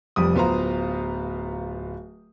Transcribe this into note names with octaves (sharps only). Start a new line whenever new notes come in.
F1 F2 G3 D#6
D1 B3 F4 C5 F5 A#5